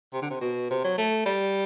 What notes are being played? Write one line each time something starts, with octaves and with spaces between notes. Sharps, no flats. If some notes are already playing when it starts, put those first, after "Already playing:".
C3
D3
C3
B2
C3
F#3
A3
G3